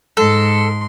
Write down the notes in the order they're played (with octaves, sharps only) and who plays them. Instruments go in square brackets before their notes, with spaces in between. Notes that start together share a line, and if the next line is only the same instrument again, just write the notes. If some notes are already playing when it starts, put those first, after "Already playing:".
[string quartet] G#2 C6 [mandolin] A4